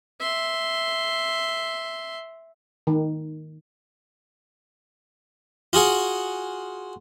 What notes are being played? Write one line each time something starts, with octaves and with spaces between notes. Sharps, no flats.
E5 C6
D#3
F4 F#4 G#4 F#5